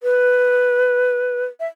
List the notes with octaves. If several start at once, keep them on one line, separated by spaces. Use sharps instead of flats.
B4
E5